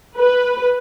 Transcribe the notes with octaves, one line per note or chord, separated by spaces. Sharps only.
B4